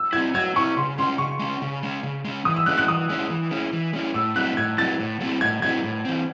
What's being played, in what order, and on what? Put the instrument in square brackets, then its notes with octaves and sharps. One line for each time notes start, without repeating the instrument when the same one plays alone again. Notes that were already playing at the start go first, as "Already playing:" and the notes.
Already playing: [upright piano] E6
[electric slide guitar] C4 E4 [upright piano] G#6
[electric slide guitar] F#3 [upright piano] G#6
[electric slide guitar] C4 E4 [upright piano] C#6
[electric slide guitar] C#3 [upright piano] C6
[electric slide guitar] G#3 C#4 [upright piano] C6
[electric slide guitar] C#3 [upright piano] C#6
[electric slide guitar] G#3 C#4
C#3
G#3 C#4
C#3
G#3 C#4
[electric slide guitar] E3 [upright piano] D#6
[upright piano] E6
[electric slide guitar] G#3 C#4 E4 [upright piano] F#6
[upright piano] F#6
[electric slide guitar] E3 [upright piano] D#6
[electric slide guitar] G#3 C#4 E4
E3
G#3 C#4 E4
E3
G#3 C#4 E4
[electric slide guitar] A2 [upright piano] E6
[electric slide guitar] F#3 A3 C4 E4 [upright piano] F#6
[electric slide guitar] A2 [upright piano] G#6
[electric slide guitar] F#3 A3 C4 E4 [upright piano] A6
[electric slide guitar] A2
F#3 A3 C4 E4
[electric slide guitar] A2 [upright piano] G#6
[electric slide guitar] F#3 A3 C4 E4 [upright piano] G#6
[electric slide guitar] A2
E3 C4